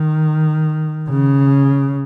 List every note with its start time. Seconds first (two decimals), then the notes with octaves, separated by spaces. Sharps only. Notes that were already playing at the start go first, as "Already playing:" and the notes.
Already playing: D#3
1.10 C#3